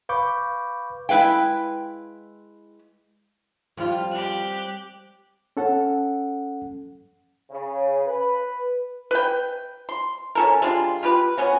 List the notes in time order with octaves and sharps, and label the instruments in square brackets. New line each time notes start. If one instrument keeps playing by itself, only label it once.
[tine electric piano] B4 F5 B5 C#6 D6 G6
[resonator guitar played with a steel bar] G#3 E4 B4 F5 G5
[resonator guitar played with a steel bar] F2 F4 [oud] G3 C4
[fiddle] G4 F#6
[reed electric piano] C#4 A4 F#5
[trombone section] C#3
B4
[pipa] B4 G5
C6
C#4 A4 A#4
G3 G#3 D4 F4
F4 G4 B4
B3 C#4 F#4